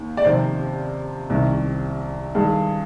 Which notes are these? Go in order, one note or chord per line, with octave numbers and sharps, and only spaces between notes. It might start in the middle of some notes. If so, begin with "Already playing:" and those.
Already playing: D#2
D5
F2 C3 D#3 C5
C2 C3 D#3
G2 D#3 G#4